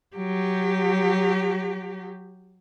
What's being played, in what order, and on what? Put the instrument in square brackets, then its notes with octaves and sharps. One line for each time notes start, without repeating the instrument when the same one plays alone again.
[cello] F#3 G4